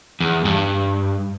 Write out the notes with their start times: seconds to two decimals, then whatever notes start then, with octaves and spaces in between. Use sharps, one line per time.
0.20 E2
0.45 G2